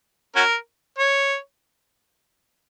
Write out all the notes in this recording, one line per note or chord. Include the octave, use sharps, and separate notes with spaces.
C#4 F#4 A#4
C#5